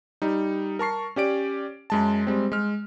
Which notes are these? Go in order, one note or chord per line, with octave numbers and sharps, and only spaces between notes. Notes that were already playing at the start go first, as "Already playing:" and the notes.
G3 D#4
A#4 A5 C#6 C7
C#4 G4 D5 D7
F#2 G#3 A5
G3 G#3 C4
G#3 F6